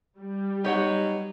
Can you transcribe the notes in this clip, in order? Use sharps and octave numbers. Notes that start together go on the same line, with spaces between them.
G3
F#3 B3 D#4 G4 C#5 F#5